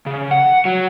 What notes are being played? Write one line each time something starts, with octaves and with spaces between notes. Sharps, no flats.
C#3
F#5
F#3